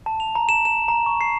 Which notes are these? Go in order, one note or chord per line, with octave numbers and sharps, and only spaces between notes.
A5
F7
A#5
E7
E7
A#5
C#6
C7